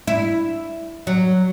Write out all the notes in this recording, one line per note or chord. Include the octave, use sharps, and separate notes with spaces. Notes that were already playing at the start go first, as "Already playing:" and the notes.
E4
F#3